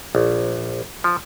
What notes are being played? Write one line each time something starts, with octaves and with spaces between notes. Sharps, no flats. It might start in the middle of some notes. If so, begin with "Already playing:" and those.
A#1
F3